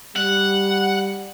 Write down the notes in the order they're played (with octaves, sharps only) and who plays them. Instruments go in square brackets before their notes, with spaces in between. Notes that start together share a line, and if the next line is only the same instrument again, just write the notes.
[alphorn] G3 [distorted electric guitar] F#5